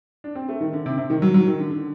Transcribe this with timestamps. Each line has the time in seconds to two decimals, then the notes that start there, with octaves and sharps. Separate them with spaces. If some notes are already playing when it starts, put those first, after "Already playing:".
0.24 D4
0.35 C4
0.49 A3
0.61 D#3
0.73 D3
0.86 C3
0.98 C3
1.10 D#3
1.22 F#3
1.34 F#3
1.47 D#3
1.59 D3
1.71 D3